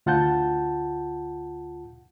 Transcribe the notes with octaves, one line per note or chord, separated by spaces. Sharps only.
D2 F4 F#5 A5 G6